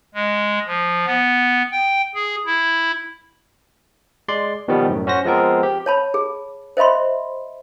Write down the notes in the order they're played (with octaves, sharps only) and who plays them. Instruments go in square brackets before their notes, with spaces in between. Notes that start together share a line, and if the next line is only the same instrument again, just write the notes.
[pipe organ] G#3
F3
B3
G5
G#4
E4
[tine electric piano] G#3 D5 C6
B2 D#3 F3 G3 B3
F#2 A2
C#4 F#4 C5 A#6
F3 G#3 B3 C4 A#4
G4
[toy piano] C#5 A5 B5
G#4
C5 D#5 E5 B5 C6